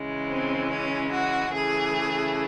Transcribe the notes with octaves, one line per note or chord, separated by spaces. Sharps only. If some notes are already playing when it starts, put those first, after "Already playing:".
Already playing: C#3 E3 G#3
C4
C#4
F#4
C#3 E3 A3 G#4